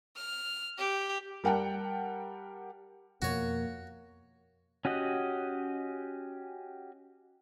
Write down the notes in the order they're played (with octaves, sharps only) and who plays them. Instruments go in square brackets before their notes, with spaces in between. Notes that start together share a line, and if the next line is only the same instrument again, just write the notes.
[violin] F6
G4
[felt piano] G3 A#4 F#5 G5 A5
[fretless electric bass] F2 B2 [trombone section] A#3 [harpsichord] F#4 C#5
[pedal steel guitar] C#4 F#4 G4 D#5 F#5